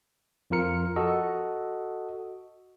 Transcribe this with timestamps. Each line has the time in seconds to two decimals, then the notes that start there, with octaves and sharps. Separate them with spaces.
0.50 F2 F3 F4 A#4 C#7
0.96 F#4 A4 D#5